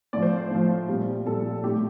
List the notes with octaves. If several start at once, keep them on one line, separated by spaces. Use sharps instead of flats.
A2 F3 D5
C5
A2 F3
A#2 G3
A#2 G3 A4
A2 G3 G4